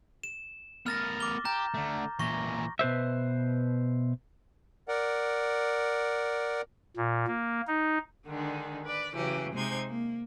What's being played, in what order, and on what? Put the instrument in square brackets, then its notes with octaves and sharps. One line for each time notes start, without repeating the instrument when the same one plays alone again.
[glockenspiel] E7
[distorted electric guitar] B3 A#4 [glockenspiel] F6 A6 A#6
[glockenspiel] D6 G7
[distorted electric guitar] G4 [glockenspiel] A#5 G6
[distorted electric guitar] D3 A3
[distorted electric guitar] A#2 E3 [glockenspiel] C#6 A#6
[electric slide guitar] B2 B4 C5 E5
[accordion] A#4 D5 F#5
[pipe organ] A#2
A#3
D#4
[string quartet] D3 D#3 G#3 D4
B4 D5
C#3 E3 F#3 G4
C3 G#3 D#4 C5 G6 G#6
A#3